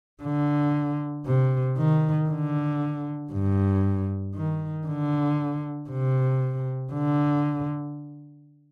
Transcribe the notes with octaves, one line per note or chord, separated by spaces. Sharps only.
D3
C3
D#3
D3
G2
D#3
D3
C3
D3